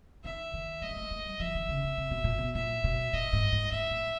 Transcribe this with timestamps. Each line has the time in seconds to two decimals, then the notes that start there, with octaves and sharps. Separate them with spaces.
0.24 D#3 E5
0.54 D#3
0.82 G3 D#5
0.90 G#3
0.96 A3
1.11 A3
1.25 G3
1.40 F3 E5
1.55 D#3
1.69 C#3
1.84 C3
1.98 C3
2.11 B2
2.24 A#2
2.38 B2
2.55 A#2 E5
2.84 B2
3.13 A#2 D#5
3.33 G#2
3.52 G#2
3.71 G#2 E5
3.90 A2